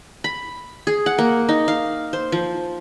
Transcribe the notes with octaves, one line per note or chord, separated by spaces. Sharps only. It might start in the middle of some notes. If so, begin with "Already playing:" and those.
B5
G#4
F#5
A#3
D#4
F5
C5
F3